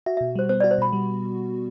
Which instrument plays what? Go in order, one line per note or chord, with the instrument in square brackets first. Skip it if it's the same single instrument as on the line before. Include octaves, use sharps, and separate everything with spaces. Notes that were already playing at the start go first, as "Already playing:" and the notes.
[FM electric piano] F#4 [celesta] E5
[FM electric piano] B2 [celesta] E5
[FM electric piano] G3 [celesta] C5
[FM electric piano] B3 [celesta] C5
[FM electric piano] F#4 [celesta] D5
[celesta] C5
[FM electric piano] B2 [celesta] B5
[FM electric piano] G3